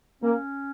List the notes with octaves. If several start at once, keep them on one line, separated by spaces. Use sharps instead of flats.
A#3 C#4